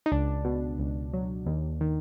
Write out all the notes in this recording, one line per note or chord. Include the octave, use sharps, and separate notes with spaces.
D#4
C#2 D4
B2
C#2
F#3
D#2
D#3